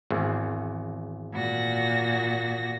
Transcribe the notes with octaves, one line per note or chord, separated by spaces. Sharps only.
G#1 E2
A#2 F#4 A#6